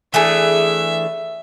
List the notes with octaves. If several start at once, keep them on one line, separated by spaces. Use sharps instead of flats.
E3 A3 D4 G#4 E5